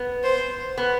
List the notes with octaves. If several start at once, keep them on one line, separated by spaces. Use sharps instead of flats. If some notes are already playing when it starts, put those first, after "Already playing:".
Already playing: B3
C5
B3